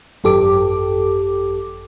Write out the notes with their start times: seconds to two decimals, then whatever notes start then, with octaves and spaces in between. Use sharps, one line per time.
0.24 G#1 F#2 G4 A4 D6